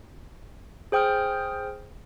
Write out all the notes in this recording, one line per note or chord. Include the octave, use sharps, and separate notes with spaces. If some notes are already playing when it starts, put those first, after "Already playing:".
G#4 C5 G5 D#6 F6 G6